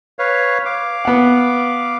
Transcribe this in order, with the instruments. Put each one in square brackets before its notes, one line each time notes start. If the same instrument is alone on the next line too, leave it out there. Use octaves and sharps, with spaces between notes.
[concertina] B4 C#5 F5
F5 D6
[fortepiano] B3 F#5